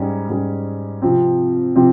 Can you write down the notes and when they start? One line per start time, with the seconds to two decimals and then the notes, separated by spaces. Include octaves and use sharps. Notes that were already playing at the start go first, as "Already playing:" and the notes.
Already playing: G#2 G3 C#4 G#4
0.29 G#2 G3 C#4 G#4
1.02 C3 F3 C4
1.76 C3 F3 C4